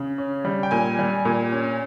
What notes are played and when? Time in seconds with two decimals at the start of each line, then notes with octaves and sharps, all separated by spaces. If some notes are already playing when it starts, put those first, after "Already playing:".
Already playing: C#3
0.18 C#4
0.45 G3
0.63 G5
0.71 A#2 G#5
0.99 G3
1.25 A#2
1.52 C#4